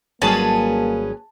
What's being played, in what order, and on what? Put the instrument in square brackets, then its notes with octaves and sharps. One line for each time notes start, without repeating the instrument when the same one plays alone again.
[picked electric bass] G#1 F#3 G3 [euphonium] A#3 [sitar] C#4 G#4 B4 [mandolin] A5